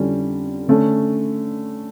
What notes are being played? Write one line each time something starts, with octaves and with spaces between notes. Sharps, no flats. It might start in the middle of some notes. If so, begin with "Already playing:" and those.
Already playing: F2 D3 G3 C#4 E4
D3 A3 C#4